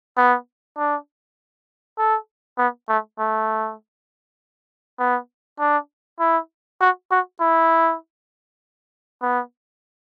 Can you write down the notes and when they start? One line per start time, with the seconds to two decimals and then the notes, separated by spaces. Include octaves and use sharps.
0.17 B3
0.78 D4
1.98 A4
2.58 B3
2.88 A3
3.19 A3
4.99 B3
5.59 D4
6.20 E4
6.80 F#4
7.11 F#4
7.40 E4
9.22 B3